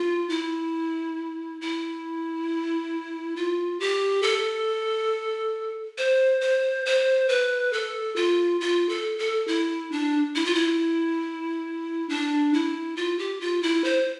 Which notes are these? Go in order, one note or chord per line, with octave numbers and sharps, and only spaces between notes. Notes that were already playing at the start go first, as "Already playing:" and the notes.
Already playing: F4
E4
E4
F4
G4
A4
C5
C5
C5
B4
A4
F4
F4
A4
A4
E4
D4
E4
F4
E4
D4
E4
F4
G4
F4
E4
C5